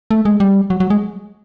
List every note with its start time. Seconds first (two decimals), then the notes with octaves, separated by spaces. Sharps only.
0.11 A3
0.25 G#3
0.40 G3
0.70 F#3
0.80 F#3
0.90 G#3